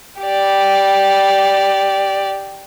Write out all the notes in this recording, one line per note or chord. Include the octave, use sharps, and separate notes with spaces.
G4 D5